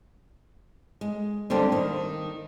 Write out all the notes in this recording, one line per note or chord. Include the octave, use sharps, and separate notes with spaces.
G#3
D3 G3 A#3 C4 D4
D#3